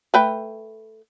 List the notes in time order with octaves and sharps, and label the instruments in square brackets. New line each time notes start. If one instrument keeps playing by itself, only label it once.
[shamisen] A3 B4 G5